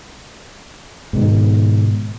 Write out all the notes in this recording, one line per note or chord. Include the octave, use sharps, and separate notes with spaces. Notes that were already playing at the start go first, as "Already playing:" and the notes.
G#2 B2 D#3